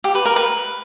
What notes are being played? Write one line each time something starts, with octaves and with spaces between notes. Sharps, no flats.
G4
B4
A#4
B4